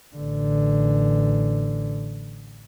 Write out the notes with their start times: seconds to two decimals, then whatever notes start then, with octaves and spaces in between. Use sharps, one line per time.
0.16 A1 D3